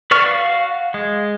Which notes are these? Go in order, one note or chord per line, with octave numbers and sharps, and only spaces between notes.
B4 D5 C#6 F6
F#4 F5
G#3